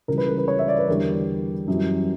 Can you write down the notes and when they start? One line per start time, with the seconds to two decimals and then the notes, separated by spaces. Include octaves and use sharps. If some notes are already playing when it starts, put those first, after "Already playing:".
0.08 C#2 C#3 E3 G3 A#4
0.18 B4
0.28 A#4
0.38 B4
0.48 C#5
0.59 E5
0.68 D5
0.79 B4
0.88 E2 D3 G3 A#4
1.68 F#2 E3 G3